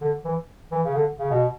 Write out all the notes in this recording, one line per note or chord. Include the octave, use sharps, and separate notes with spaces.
D3
E3
E3
C#3
D3
C#3
B2